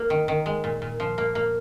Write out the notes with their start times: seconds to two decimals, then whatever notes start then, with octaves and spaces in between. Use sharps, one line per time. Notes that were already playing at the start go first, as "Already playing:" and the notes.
Already playing: A#3
0.10 D#3
0.28 D#3
0.46 G#3
0.64 A#2
0.82 A#2
1.00 F3
1.18 A#3
1.35 A#3